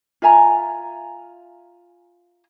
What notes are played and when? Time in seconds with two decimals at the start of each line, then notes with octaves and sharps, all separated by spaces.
0.22 F4 E5 G#5 A#5